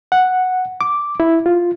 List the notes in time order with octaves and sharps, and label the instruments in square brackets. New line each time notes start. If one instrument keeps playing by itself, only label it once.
[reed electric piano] F#5
D6
E4
F4